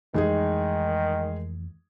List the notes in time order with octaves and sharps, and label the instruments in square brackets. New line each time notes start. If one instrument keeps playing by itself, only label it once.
[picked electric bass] F2 E3 A3 [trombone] D#3 [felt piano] G#3 D#4 G#4